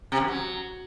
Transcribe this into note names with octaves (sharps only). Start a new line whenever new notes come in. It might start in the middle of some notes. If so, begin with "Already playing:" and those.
C3
F#2
F#3